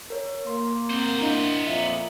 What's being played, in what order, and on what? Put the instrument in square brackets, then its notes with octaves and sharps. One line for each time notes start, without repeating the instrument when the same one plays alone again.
[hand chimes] A#4 C#5
[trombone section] A#3 [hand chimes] C6
[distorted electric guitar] B3 C5 [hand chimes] C4
[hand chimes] D4 E4 D#5
[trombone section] F2 A#2 A#3 [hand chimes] E5